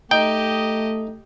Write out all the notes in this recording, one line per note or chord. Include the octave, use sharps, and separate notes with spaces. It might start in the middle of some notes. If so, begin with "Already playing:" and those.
A3 D#4 G4 D#5 G5